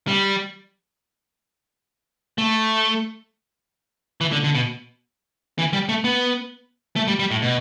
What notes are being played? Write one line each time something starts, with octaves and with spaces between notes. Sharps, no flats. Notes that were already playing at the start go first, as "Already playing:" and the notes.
G3
A3
E3
D3
D3
B2
E3
G3
A3
B3
A3
G3
G3
A2
B2